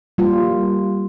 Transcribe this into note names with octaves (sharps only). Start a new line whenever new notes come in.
G3 A#3 F4